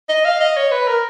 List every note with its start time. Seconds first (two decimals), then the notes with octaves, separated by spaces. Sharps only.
0.09 D#5
0.25 F5
0.40 D#5
0.57 C#5
0.72 B4
0.88 A#4